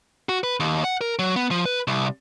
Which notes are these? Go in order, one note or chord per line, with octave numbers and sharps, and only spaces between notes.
F#4
B4
D#2
F#5
A#4
F#3
B3
F3
B4
C2